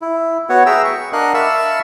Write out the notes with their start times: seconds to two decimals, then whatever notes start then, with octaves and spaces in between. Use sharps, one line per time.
0.02 E4
0.49 B3 F#4 C#5 F#5
0.66 G#4 E5 G5 A#5 E6
0.85 C#6
1.13 D4 A#4 D#5 F5 F#5 F#6
1.34 E5 F5 A5 B5 C#6 E6